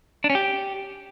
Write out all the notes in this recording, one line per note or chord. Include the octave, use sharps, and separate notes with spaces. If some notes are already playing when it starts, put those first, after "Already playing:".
D4
C#4
G4